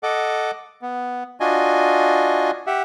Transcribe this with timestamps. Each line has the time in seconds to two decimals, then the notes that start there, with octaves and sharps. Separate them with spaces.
0.03 A4 D#5 F#5 D6
0.82 B3
1.40 D4 F4 F#4 D#5 G#5
2.67 G4 E5 F#5